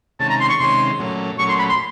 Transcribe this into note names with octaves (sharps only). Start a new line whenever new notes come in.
C3 D#3 G#3 C#4 A5
A#5
C6
C#6
C3 D#3 G#3 C#4 C6
A#2 F#3 A3 C#4
A#2 F#3 A3 C#4 C#6
C6
B5
C6